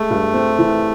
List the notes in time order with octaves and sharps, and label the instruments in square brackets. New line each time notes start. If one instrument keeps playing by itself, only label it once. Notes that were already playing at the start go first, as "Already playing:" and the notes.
Already playing: [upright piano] G#3 [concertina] A3
[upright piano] G2
C4
E3